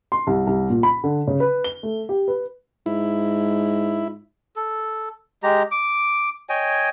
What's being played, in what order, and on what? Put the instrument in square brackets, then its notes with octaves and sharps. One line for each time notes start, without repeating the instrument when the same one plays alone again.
[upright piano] C6
C2
C2
A#2
B5
D3
C#3
B4
G7
A3
G4
B4
[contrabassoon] G#2 [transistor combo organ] E4
[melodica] A4
G#3 G4 A#5
D6
C#5 D#5 G5 G#5